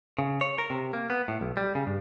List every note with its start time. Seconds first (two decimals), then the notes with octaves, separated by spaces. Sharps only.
0.19 C#3
0.41 C#5
0.58 A#4
0.70 C3
0.93 A#3
1.10 B3
1.28 A2
1.41 B1
1.57 G3
1.75 C#3
1.87 G2